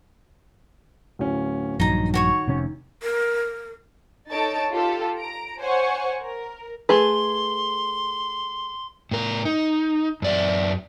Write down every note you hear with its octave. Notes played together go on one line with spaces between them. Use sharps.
D1 C#4
A#1 G2 D#3 F#3 D#4 A#5
F#4 C#5 C#6
F1 C3 C#4
A#4
D#4 A4 C#5 A5 A6 D7
F4 G4 A4
A#5 D7
C5 C#5 F#5 G#5 C#6
A#4
A3 G#4 B4 C6
A2 A#4
D#4
F#2 D5 E5